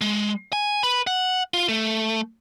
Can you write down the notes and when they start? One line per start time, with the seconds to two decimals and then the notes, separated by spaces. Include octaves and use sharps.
0.01 G#3
0.53 G#5
0.83 B4
1.07 F#5
1.54 F4
1.69 A3